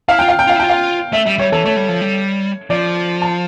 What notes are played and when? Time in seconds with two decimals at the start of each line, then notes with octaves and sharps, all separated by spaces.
0.09 E4 F5
0.19 F4 G5
0.28 F5
0.39 G5
0.47 F4 F5
0.56 E4
0.60 F4 G5
0.70 F5
1.12 A3 E5
1.26 G3 E5
1.39 G3 C#5
1.52 E3 A4
1.65 A3 C#5
1.76 G3
1.89 F3
2.02 G3
2.70 F3 D5
3.22 A5